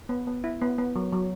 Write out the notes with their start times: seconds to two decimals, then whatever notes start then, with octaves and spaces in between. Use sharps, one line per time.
0.09 B3
0.27 B3
0.44 E4
0.61 B3
0.78 B3
0.96 F#3
1.13 F#3